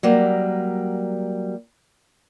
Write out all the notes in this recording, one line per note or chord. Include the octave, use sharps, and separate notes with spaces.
F#3 G3 A#3